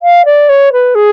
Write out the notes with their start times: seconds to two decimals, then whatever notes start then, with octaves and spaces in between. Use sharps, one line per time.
0.03 F5
0.25 D5
0.49 C#5
0.73 B4
0.95 G#4